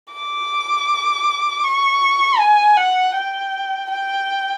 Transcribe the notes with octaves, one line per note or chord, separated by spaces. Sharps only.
D6
C#6
G#5
F#5
G5
G5